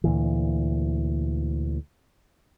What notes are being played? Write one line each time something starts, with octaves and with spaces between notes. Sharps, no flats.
D2 A#2 E3